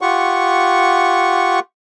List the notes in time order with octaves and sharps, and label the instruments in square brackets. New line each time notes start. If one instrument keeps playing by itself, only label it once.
[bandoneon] F4 G4 F#5 C#6